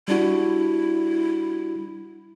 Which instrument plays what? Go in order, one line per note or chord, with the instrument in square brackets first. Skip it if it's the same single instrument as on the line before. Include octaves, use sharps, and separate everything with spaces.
[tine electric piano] G3 D4 F#4 [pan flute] E4